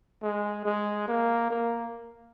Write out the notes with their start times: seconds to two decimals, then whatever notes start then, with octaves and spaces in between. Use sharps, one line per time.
0.23 G#3
0.65 G#3
1.08 A#3
1.50 A#3